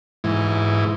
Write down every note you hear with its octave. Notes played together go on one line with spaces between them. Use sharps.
G#2 E3